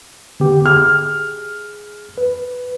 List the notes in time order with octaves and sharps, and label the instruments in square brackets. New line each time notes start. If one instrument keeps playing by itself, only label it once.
[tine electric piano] D3 B3 G4
[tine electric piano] G#4 [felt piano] F6
[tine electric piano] B4